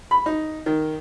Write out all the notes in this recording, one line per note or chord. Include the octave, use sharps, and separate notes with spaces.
B5
D#4
D#3